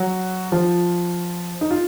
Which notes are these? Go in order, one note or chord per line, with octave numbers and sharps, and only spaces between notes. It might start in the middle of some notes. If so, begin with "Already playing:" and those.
Already playing: F#3 F#4
F3 F4
D#4
F4